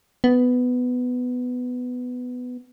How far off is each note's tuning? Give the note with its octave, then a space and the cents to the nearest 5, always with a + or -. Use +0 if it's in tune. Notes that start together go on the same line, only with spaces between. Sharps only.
B3 +10